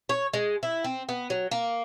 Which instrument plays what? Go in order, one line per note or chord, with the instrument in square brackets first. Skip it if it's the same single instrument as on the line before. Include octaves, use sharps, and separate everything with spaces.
[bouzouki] C#5
G#3
E4
C4
B3
F#3
A#3